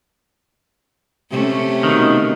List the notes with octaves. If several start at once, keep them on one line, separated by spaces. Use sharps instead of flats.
C3 A3 C#4
B2 D#3